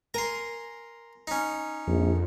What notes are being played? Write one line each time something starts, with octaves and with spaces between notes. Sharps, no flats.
A#4 G#5 A#5 C6
C#4 D#4
A#1 F2